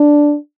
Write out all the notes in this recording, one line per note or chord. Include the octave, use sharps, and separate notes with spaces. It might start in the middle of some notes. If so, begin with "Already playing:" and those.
Already playing: D4